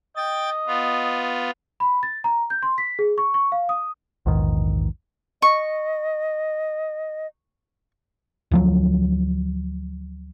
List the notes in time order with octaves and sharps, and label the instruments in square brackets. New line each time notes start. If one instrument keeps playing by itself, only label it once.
[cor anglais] D#5 [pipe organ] G5 A6
[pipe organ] B3 F4
[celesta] B5
A6
A#5
G6
C6
B6
G#4
C#6
C#6
F5
D#6
[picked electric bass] A#1 E2 G#2 D#3
[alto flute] D#5 [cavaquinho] C#6
[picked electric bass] D2 F3 F#3